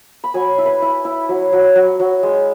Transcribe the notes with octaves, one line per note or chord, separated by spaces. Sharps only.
B5
F#3 G#5
E4
B4
E4
E4
F#3
F#3
F#3
F#3
G#3